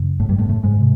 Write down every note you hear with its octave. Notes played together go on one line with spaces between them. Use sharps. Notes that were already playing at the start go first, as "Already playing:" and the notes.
Already playing: F#2 C#3
A2 A3
G2 G3
A2 A3
A2 A3
G#2 G#3
C3